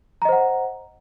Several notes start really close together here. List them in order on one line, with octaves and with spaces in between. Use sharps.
A#5 D#5 C5 F#5